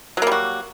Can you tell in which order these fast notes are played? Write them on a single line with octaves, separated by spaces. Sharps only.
F#3 A#3 G3 F#4